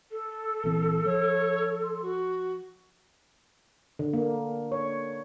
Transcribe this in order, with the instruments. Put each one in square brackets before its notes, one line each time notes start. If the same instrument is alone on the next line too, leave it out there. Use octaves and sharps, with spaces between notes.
[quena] A4
[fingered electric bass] A#1 E3 C4
[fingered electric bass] F3 [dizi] C#5
[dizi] C6
F#4
[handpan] D3
A#3
C#5